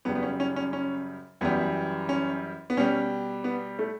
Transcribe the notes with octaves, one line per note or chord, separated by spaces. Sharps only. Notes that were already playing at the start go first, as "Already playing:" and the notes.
F#2 C#3 G3 B3
B3
C#4
C#4
C#4
C#4
F#2 E3 G3 B3
C#4
B3
B2 G3 C#4
B3
A3